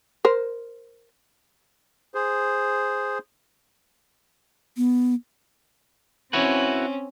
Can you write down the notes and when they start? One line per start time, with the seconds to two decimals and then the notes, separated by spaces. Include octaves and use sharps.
0.25 A#4 C5
2.14 G#4 C5
4.77 B3
6.33 C4 C#4 E4 F#4 B4